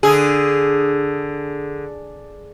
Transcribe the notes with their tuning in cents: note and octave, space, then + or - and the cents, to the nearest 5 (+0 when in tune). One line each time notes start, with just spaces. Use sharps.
D3 +0 G#4 +0